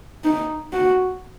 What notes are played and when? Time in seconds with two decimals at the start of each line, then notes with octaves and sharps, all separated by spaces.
0.24 D#4
0.73 F#4